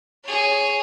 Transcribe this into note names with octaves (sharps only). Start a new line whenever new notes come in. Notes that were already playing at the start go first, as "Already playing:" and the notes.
G#4 C#5